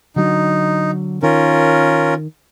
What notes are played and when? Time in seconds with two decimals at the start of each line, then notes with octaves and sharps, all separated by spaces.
0.16 D3 F#3 D#4
1.23 D#3 C#4 F4 A#4